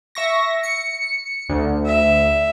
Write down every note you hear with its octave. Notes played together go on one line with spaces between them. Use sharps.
E5 C#6 A#6
C#7
D2
E5